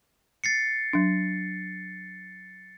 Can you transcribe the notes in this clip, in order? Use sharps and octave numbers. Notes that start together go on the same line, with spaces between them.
A6 C7 C#7
F#3 D4